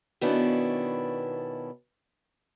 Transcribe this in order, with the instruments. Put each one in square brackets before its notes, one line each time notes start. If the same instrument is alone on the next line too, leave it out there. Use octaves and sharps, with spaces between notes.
[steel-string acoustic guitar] B2 D#3 B3 C#4 D4 E4